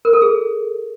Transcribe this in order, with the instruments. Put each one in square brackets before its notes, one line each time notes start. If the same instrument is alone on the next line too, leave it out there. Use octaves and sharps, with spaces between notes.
[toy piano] A#4
A4
G#4